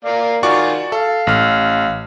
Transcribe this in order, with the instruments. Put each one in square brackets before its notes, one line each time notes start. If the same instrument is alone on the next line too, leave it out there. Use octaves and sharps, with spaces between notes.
[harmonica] A#3 D5 F5
[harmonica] D#3 F4 G#5 [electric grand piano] F#4 D5 C#6
[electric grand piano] A4 [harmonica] F5
[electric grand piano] A1 F6